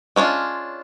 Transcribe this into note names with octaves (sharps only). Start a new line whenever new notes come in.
G#3 C#4 D4 F4